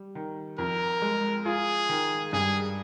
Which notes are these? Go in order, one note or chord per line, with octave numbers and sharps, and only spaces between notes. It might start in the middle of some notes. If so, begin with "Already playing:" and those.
Already playing: G3
D#3
F2 A#4
G#3
F4 G#4
D#3
G2 G#4